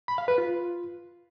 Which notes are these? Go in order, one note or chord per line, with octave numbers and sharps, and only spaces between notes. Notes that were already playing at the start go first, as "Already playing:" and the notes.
B5
F5
B4
F4